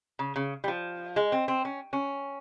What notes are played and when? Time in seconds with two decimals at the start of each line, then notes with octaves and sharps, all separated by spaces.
0.19 C#3
0.36 C#3
0.64 G3
0.68 F3
1.16 G#3
1.32 C4
1.48 C4
1.65 C#4
1.93 C#4